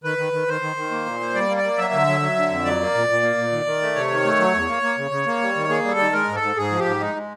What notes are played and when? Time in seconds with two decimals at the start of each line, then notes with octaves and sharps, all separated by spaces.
0.04 D#3 B4
0.18 D#3
0.33 D#3
0.48 D#3 C5
0.62 D#3
0.76 D#3
0.91 A#3
1.06 A#2
1.20 A#3
1.34 G3 D5
1.49 A#3
1.57 D5
1.64 A#3
1.78 F#3 E5
1.93 D3
2.07 F#3
2.21 F#3
2.36 D3
2.50 F2
2.65 F#3 D5
2.80 A#3
2.94 A#2
3.09 A#2
3.23 A#3
3.38 A#2
3.52 D#3
3.66 D#3
3.82 A3
3.96 C3 C#5
4.11 D#3
4.24 A3
4.39 F#3
4.54 E2
4.68 A#3
4.83 A#3
4.98 C#3
5.11 C#3
5.26 A#3
5.41 G3
5.56 D#3
5.69 A#3 G#4
5.84 G3
5.91 A4
5.99 D#3
6.13 G#3 A#4
6.28 G#2
6.35 A4
6.42 G#2
6.56 G#2 G#4
6.71 F3
6.79 G4
6.85 G#2
7.00 G#3 D#4
7.15 G#3